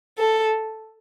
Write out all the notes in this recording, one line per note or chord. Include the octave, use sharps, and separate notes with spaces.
A4